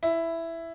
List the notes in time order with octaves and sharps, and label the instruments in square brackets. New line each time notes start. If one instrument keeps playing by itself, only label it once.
[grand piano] E4